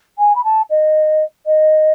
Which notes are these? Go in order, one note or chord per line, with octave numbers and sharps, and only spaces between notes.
G#5
B5
A5
D#5
D#5